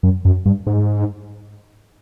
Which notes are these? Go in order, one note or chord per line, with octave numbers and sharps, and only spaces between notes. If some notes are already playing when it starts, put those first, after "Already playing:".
F#2
F#2
G2
G#2